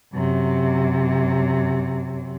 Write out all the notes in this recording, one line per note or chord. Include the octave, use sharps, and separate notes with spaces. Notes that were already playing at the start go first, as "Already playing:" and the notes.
F#2 C3